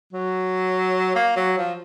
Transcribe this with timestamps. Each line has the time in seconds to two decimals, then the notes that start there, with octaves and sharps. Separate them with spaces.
0.13 F#3
1.15 A#3
1.36 F#3
1.58 F3